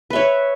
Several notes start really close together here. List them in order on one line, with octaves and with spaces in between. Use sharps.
B4 E5 C#5